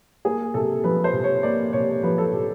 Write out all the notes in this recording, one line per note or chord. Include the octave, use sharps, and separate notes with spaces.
A#3 G#4
C3 A4
F3 B4
C5
C3
C#5
A#3 D5
C3 C#5
F3 B4
A4
C3 G4